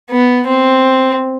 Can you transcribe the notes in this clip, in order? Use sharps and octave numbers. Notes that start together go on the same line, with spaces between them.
B3
C4